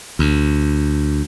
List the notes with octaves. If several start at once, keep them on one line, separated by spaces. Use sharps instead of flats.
D2